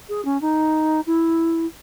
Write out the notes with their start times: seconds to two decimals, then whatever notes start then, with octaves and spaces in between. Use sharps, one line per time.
0.09 G#4
0.24 C#4
0.41 D#4
1.06 E4